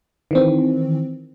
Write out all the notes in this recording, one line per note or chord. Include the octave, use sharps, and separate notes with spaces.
D#3 E3 C4